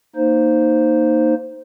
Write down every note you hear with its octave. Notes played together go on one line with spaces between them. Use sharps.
A#3 D#4 C5